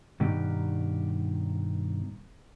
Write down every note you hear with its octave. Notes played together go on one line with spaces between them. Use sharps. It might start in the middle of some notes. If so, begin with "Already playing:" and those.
G2 B2 D#3 G4